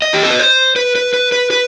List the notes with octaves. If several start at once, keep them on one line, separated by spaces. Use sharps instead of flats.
D#5
G4
A4
B4
C5
B4
B4
B4
B4
B4